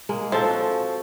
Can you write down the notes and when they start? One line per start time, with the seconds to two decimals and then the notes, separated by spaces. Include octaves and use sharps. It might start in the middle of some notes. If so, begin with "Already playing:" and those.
0.09 G#3 A#3
0.32 F3 C4 A4 C5
0.45 F#4